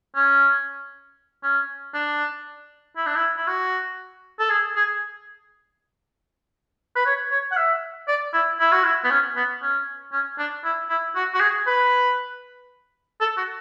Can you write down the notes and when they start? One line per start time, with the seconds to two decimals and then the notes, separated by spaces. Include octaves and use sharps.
0.15 C#4
1.43 C#4
1.94 D4
2.96 E4
3.06 D4
3.15 E4
3.37 E4
3.47 F#4
4.39 A4
4.50 G#4
4.75 G#4
6.96 B4
7.06 C#5
7.31 C#5
7.52 F#5
7.56 E5
8.08 D5
8.33 E4
8.60 E4
8.72 F#4
8.84 E4
9.04 B3
9.10 C#4
9.36 B3
9.62 C#4
10.12 C#4
10.38 D4
10.64 E4
10.89 E4
11.15 F#4
11.34 F#4
11.40 G#4
11.67 B4
13.20 A4
13.37 F#4